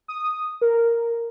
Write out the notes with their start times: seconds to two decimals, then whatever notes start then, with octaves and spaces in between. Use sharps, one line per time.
0.08 D#6
0.61 A#4